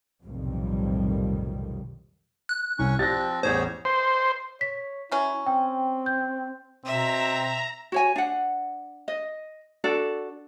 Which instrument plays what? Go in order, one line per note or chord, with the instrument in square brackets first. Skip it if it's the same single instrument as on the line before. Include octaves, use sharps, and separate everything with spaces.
[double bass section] B1 F2 A2 C3 D#3 G3
[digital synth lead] F#6
[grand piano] C2 [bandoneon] C#4 C#6
[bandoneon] F3 C4 [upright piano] G4 D5 [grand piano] A6 A#6
[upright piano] A1 E2 A2 [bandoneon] G3 G#4 C#5 [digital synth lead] C5
[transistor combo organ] C5
[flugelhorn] C#5 [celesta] B6
[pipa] F#3 C#4 [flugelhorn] E4
[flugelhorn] C4 [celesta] G5
[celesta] G6
[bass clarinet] B2 [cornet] C4 [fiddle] E5 [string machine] A#5
[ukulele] F#4 C#5 G#5
D4 F#5
D#5
D4 F#4 A4 D5